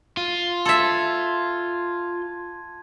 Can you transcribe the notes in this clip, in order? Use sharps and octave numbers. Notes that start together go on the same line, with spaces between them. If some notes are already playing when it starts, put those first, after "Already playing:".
F4 D#7
A4 E5 A5 C6 G#6